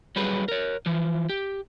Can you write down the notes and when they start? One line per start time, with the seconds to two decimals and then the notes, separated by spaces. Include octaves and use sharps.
0.16 F#3 G3 G#4 B4
0.48 A#4 C#5
0.86 E3 F3
1.29 G4